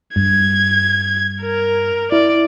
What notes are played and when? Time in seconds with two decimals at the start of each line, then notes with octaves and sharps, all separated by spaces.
0.16 G2 G#6
1.42 A#4
2.12 E4 D5